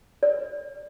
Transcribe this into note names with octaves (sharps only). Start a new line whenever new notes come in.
D5